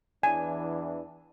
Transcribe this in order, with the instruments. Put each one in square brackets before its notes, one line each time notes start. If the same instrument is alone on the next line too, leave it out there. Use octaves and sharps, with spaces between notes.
[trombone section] E2 E3 D4 [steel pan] G#5